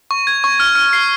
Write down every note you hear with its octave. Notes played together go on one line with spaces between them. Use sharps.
C#6
G#6
C#6
F6
F6
C7